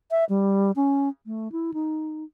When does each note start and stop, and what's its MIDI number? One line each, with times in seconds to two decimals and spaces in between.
0.11 0.24 76
0.29 0.71 55
0.76 1.09 61
1.26 1.51 57
1.52 1.71 64
1.73 2.24 63